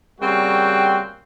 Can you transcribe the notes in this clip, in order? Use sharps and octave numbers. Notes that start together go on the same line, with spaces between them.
C#3 G3 A#3 C4 F#4 G5